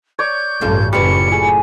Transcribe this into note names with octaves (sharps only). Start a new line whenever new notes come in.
C#5 D5 G6
A1 G2 C#3 A#3 F4 A4
F#1 F#2 A2 G3 F4 B4 C#7
G#4 B5